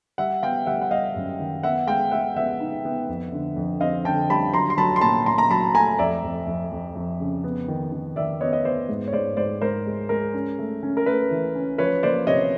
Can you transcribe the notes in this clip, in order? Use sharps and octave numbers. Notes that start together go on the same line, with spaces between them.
G3 E5 F#5
B3 F5 G5
G3 E5 F#5
F#5
G3 D#5 F5
F#2
D#3
B3 E5 F#5
G#3 F5 G5
G#3 E5 F#5
B3 E5 F#5
D#4
B3
F2
D3
F2
C4 D#5 F5
D3 G5 A5
G3 A5 B5
F#3 A#5 C6
C6
F#3 A5 B5
C6
A#2 A5 B5
A#2 A#5 C6
A#5
F#3 A5 B5
A3 G#5 A#5
F2 D5 E5
F2
F2
F2
F2
C#3
B3
D#3
D#3
D#3 D5 E5
B3 C#5 D#5
D#5
B3 C5 D5
G#2
C#5
G#2 C5 D5
G#2 C5 D5
G#2 A#4 C5
G#3
G#3 A#4
C#4
A3
C#4
A#4
A3 B4
E3
C#4
F3 B4 C#5
A#3 C5 D5
C3 C#5 D#5